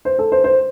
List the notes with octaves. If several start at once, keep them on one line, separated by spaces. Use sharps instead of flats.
C5
A4
C5
C5